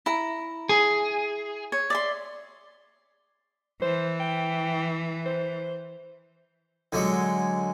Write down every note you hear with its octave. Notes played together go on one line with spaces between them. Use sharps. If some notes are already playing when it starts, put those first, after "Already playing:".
E4 A#5
G#4
C#5
D5 E5 C6
E3 C5
G5
C5
D3 F#3 G#3